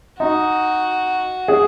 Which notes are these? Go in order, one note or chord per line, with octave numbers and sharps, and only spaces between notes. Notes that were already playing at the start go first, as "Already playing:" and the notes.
D#4 F#4
G#4